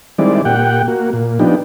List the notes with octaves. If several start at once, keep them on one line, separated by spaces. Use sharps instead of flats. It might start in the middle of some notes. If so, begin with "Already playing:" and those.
D#3 G3 G#3 C4 E4 D5
A#2 G4 F#5 G5
A#3 F#4
A#2
F3 B3 D4 D#4 G4